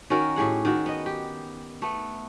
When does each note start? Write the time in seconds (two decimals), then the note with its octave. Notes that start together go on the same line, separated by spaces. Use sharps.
0.10 D#3 C#4 F#4 A#4
0.36 A2 G4 G#4 F#5
0.65 D#3 F#4
0.86 B3 D#5
1.06 G4
1.82 A3 B3